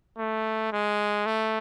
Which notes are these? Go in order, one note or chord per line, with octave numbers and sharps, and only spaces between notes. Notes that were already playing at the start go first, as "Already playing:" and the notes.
A3
G#3
A3